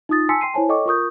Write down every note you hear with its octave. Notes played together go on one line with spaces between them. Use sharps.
D#4 F4 D#6 A6
G#5 A5 C6 E6 B6 C#7
G5 C6 C7 D#7
E4 C5 C#5 G#5 A5
A4 C#5 D#5 G5 C#6 D6
F4 A#4 C#6 D#6 G6